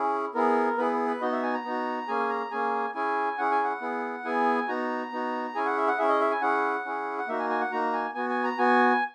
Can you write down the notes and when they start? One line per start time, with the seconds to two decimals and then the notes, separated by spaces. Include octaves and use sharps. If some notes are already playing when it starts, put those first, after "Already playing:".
Already playing: C#4 E4 G#4
0.35 B3 E4 G#4 A#4
0.78 B3 E4 G#4 B4
1.07 B4
1.21 B3 D#4 F#4 D#5
1.32 E5
1.43 G#5
1.54 A#5
1.64 B3 D#4 F#4
2.08 A#3 C#4 G#4 G#5
2.29 A#5
2.51 A#3 C#4 G#4 G#5
2.95 C#4 E4 G#4 G#5
3.38 C#4 E4 G#4 F#5
3.51 G#5
3.64 F#5
3.81 B3 E4 G#4
4.25 B3 E4 G#4 G#5
4.68 B3 D#4 F#4 A#5
5.11 B3 D#4 F#4
5.55 C#4 E4 G#4 G#5
5.66 F#5
5.77 E5
5.87 F#5
5.98 C#4 E4 G#4 E5
6.09 D#5
6.20 E5
6.31 G#5
6.41 C#4 E4 G#4 F#5
6.85 C#4 E4 G#4
7.18 F#5
7.28 A#3 D#4 F#4 E5
7.39 G#5
7.50 G#5
7.60 F#5
7.71 A#3 D#4 F#4 A#5
7.93 G#5
8.15 B3 F#4 G#5
8.30 G#5
8.44 A#5
8.58 B3 F#4 G#5